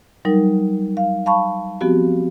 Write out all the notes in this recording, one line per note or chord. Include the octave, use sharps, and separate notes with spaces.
F#3 G3 D#4 A#4
F5
F5 A5 B5 C#6
F3 B3 C4 F#4 G4